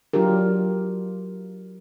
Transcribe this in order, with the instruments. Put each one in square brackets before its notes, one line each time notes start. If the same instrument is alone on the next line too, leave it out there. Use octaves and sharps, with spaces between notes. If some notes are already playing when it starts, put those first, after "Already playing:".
[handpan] F#3 D4 F4 G4 A#4